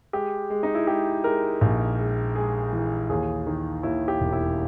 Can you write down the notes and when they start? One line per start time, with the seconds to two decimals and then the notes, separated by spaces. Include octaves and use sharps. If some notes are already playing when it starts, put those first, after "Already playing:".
0.13 G#3 G4
0.50 G#3
0.63 D#4
0.75 E4
0.87 G#3 G4
1.24 G#3 A#4
1.61 A#1
1.98 G#3
2.35 G#3 G#4
2.73 E3
3.09 D#2 G#4
3.46 D#3
3.83 D#2 E4
4.08 G4
4.20 E1
4.33 E4